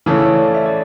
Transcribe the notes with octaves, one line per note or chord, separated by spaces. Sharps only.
C#3 E3 A3 C#4
C#5
D5
E5
D5